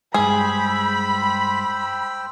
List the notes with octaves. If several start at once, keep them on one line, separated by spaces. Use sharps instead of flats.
G2 G#3 G#4 C5 G5 B5 E6